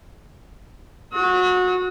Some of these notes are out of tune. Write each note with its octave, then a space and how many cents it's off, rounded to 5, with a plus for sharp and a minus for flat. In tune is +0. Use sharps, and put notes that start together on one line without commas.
F#4 -20 D#6 +45